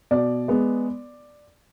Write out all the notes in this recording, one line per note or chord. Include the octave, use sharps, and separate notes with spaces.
B2 D5
G#3 B3